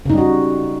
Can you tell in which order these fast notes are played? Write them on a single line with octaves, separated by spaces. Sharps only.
C#3 D#4 G3 F#4